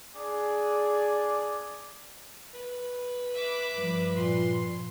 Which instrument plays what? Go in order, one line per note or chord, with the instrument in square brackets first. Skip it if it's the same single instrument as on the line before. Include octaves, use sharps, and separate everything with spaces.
[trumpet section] D4 G#4 [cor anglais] D5
[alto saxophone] B4
[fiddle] E5 D6
[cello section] G2 F3
[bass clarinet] A#2 [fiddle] C6